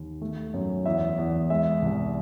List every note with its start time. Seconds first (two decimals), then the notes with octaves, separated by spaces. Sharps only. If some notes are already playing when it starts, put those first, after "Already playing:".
Already playing: D#2
0.22 A3
0.54 F#2
0.86 E2 E5
1.18 E2
1.50 G#3 E5
1.82 C2